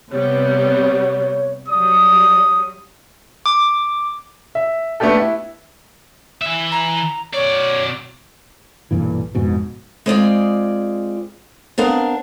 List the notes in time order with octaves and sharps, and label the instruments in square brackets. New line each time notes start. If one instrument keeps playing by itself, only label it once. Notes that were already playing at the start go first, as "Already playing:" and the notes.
[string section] C3 G3 B3 [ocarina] C#5
[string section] F#3 G3 [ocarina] D5 [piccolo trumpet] D#6
[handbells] D6
[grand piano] E5
A3 B3 D4 G4 A4
E4
[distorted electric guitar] E3 E5
[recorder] A#5
[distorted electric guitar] B2 D5 [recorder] C#5
[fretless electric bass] B1 G2 A#2 E3
A1 F2 G#2 B2
[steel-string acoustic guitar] G#3 C4 F4 D5
B3 C4 D4 A#4 F5 A#5